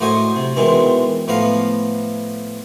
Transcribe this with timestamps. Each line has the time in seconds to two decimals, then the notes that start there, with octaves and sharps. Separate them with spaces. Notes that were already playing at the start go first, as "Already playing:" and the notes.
0.01 A2 F#3 C5 D#5 G#5
0.36 C3
0.56 B2 D#3 E3 G#3 C4
1.28 A2 F3 B3 F5 A#5